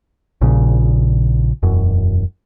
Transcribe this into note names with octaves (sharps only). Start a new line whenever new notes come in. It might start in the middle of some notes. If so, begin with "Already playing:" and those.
A#1 A#2 C#3
E1 F#2